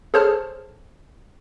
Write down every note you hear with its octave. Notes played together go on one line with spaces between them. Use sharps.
G#4 A4 C5 C#5 A5 F6